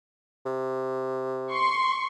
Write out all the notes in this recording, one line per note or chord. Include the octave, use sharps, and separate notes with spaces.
C3
C6 C#6